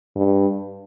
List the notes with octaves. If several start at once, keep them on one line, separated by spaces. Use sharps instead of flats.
G2